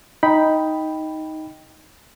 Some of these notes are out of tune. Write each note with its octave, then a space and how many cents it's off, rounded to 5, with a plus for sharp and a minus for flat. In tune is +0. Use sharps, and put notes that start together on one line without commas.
D#4 +10 G5 +0 B5 +0